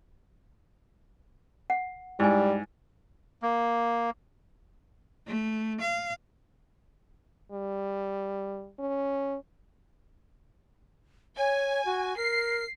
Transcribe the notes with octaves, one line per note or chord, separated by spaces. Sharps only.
F#5
G#2 G3 E4 G#5
A#3
A3
F5
G3
C#4
C#5 G#5
F#4
A#4 C7